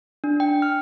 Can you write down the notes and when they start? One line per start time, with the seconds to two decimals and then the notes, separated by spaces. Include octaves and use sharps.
0.24 D4
0.40 G5
0.62 F6